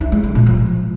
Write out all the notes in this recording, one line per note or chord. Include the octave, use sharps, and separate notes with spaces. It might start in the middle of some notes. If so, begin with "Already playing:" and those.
E4
G#3
D3
A#2
F3